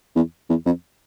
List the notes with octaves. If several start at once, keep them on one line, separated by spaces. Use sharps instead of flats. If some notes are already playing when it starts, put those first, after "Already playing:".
E2
E2
F2